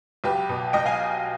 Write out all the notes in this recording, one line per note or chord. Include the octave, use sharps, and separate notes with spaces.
B1 G4 B4
B2
B1 D#5 G5
F5 G#5